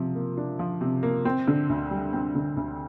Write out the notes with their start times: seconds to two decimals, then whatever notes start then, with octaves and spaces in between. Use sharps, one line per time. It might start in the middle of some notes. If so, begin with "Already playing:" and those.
Already playing: C3 F3
0.15 A#3
0.37 D4
0.59 F3
0.81 C3
1.03 A#3
1.25 C4
1.48 D3
1.69 D2
1.90 G3
2.13 C4
2.35 D3
2.57 D2